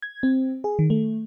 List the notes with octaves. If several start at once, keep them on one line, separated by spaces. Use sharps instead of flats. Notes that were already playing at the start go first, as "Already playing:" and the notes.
G#6
C4
G#4
D#3
A3